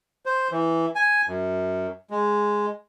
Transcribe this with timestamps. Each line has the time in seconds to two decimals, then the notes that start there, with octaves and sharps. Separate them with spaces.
0.26 C5
0.51 E3
0.96 G#5
1.28 F#2
2.10 G#3